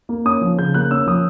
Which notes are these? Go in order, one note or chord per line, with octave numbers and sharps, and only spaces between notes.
A#3
C#4 D#6
F3
C#3 G6
A#3 F#6
C#4 E6
F3 D#6